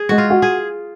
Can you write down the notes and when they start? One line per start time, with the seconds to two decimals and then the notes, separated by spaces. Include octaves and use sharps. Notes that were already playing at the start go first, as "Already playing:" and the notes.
Already playing: G#4
0.09 G#3 F#4
0.18 F4
0.30 F#4
0.42 G#4